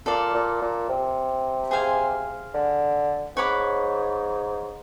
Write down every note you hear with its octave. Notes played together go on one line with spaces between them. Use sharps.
A#2 A4 D5 F5
A#2
A#2
C3
G#4 C5 F5 G#5
D3
G#2 C#5 F#5 B5 D6